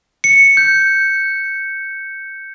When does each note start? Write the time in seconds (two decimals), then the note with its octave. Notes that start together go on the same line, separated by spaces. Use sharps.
0.24 C#7
0.57 G6